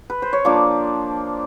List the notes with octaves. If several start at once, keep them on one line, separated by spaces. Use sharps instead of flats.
B4
C5
C#5
F3 A#3 D4 D5